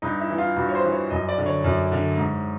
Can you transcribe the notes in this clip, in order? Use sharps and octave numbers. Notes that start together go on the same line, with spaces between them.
G2 D#4
E4
E3
F4
G2 F#4
C#5
C5
E3
C#5
F#2 D#5
D5
D3
C#5
F#2
D3
G#2